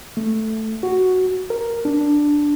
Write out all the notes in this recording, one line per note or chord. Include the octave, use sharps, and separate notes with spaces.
A3
F#4
A#4
D4
D4